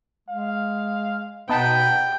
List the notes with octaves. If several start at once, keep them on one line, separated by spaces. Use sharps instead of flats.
G#3 F5
B2 B3 D#4 B4 G5 A5